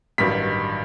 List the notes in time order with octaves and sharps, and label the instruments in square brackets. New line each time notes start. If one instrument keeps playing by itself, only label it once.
[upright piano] A1 G2 D#3 F#3 B6